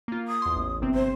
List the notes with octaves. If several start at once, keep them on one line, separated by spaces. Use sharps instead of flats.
A#3 F4
D#6
E2 C6
A1
G1 C3 C4
C5